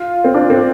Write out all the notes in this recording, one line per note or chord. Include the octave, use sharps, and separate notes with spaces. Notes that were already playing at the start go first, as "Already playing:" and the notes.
Already playing: F4
C4
D4
C4